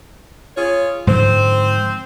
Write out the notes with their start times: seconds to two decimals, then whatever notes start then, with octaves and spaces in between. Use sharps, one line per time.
0.57 F4 G#4 C#5
1.07 G#2 D3 F3 C4 C5